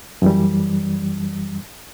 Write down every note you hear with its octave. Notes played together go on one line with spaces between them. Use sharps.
F#2 E3 G3